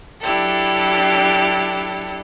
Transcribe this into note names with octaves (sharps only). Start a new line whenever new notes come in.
F#3 D4 E4 G4 A4